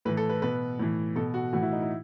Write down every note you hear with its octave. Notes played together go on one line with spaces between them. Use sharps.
A2 E3 B4
A4
B4
B2 B4
A2 E3
B2 A4
F#4
A2 E3 F#4
E4
D#4
E4